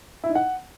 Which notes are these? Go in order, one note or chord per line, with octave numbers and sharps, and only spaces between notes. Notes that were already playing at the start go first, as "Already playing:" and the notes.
E4
D#4
F#5